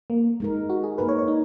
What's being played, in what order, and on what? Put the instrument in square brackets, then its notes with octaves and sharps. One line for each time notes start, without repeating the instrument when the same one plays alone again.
[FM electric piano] A#3
[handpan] G#3 D#4 A#4
[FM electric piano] F#4
G#4
[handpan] A#3 D#4 A#4 [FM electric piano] B4
[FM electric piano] C#5
C#5
D#4